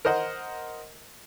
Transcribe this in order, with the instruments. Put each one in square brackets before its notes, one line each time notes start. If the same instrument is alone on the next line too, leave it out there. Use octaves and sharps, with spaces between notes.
[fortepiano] A#4 C5 D#5 F#5